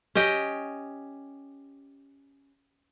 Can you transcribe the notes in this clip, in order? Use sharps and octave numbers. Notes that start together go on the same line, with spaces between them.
C#4 G4 D#5 G5